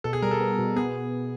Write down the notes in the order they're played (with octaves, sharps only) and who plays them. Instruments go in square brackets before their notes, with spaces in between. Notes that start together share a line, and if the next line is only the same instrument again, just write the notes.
[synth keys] B2 [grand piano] A4
[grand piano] G#4
[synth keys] G3 [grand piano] A#4
[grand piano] A4
[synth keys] B3
B2
[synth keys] B3 [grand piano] G#4